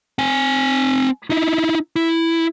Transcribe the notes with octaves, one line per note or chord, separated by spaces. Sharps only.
C4 G#5
D#4 E4
E4